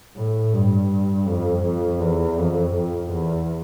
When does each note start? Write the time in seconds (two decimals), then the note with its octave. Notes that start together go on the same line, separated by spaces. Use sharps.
0.16 A2
0.54 G2
1.27 F2
1.64 F2
2.00 E2
2.38 F2
2.75 F2
3.12 E2